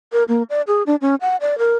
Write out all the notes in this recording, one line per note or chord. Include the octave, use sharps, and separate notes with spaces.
A#4
A#3
D5
G#4
D4
C#4
F#5
D5
A#4